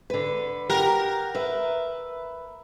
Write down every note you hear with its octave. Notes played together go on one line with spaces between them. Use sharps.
D3 B4
G4 A#4 F#5
B4 E5